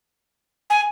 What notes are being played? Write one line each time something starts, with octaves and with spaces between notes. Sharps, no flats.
G#5